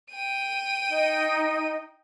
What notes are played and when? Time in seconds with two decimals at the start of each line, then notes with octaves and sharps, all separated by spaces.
0.12 G5 D#7
0.89 D#4